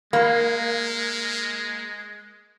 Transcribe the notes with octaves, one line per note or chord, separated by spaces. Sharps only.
G#3 A#3